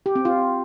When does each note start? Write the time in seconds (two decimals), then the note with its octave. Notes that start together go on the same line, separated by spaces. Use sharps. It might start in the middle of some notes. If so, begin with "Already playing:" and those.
0.06 G4
0.15 C4
0.25 F4